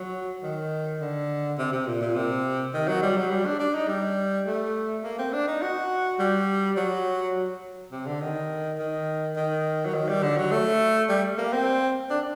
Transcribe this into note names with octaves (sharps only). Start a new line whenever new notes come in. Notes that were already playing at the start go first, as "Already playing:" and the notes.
Already playing: F#3
D#3
D3
C3
C3
A#2
A#2
C3
D#3
F#3
G3
F#3
G3
D4
D4
D#4
G3
A3
A#3
C4
D4
D#4
F#4
G3
F#3
C3
D3
D#3
D#3
D#3
F#3
D#3
G3
D3
F#3
A3
G3
A#3
C4
D4